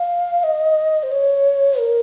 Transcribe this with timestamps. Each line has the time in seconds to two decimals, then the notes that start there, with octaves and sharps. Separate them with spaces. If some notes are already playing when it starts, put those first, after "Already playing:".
Already playing: F5
0.44 D#5
1.03 C5
1.12 C#5
1.79 A#4